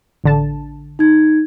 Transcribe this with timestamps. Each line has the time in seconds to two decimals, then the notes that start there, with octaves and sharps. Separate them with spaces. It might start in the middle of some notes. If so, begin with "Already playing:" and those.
0.24 A1 D3 A5
0.99 D#4 G#6